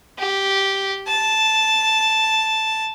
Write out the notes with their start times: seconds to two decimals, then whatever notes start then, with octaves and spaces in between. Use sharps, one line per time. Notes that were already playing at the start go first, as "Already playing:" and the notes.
0.19 G4
1.07 A5